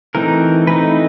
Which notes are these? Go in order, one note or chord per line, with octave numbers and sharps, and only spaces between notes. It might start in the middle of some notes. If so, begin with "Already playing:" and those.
E3 A3 C4 D#4 A#4
E3 A3 C4 D#4 B4